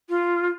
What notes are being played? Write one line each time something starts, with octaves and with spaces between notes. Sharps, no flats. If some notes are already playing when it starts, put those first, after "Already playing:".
F4